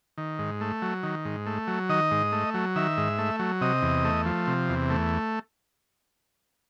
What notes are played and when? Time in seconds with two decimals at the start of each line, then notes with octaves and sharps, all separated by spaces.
0.18 D#3
0.39 G#2
0.61 A3
0.82 F#3
1.03 D#3
1.25 G#2
1.46 A3
1.67 F#3
1.89 D#3 D#5
2.11 G#2
2.32 A3
2.54 F#3
2.76 D#3 E5
2.97 G#2
3.18 A3
3.39 F#3
3.61 C3 D#5
3.82 E2
4.04 A3
4.26 F3
4.47 C3
4.69 E2
4.90 A3